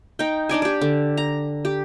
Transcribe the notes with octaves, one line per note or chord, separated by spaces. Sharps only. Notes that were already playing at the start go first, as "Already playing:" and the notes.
D#4 G5
D4 D#4 D5 G#5
G4 D5
D3
A#5
G4